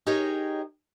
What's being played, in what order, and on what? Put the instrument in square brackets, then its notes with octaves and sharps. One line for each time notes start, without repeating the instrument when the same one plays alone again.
[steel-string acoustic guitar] D#4 G4 G#4 A#4 C#5 D#5